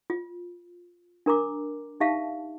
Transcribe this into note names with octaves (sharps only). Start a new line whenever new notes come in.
F4
D4 A#4 A#5 D6
D#4 G4 E5 F5 A5